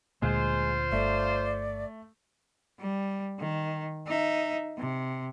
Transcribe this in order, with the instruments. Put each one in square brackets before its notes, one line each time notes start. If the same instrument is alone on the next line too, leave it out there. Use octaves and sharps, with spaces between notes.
[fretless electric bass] D2 A#2 [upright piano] G#3 [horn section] F4 C5
[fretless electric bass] G1 [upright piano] A3 [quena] D5
[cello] G3
D#3
D#4 E5
C3